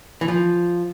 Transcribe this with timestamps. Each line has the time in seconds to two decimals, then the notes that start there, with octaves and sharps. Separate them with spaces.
0.21 E3
0.28 F3